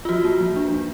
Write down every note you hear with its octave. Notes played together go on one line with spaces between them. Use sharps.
F4
F3 F#4
A#3
F3
D4
F3